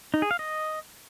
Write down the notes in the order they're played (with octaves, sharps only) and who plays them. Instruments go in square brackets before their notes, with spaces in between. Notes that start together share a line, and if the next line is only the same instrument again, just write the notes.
[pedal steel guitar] D#4
G#4
F5
D#5